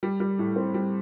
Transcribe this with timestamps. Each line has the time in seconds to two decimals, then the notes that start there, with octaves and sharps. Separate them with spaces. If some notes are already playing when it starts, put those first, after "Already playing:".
0.03 G3
0.20 G3
0.39 A2
0.56 C4
0.74 G3